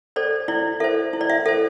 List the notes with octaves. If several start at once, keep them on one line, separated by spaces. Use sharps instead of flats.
A4 C5 D5
E4 D5
A4 C5 E5
E4
D5
E5
A4 C5 E5